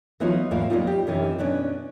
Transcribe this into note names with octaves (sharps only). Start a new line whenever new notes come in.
E3 F#3 B3 D#4 F4 F#4
E2 G#2 A#3 E4 F5
F#3 G3 A#3 B3 D#4 F4
G4
F#2 C3 E3 D#4
B2 B3 C#4 D4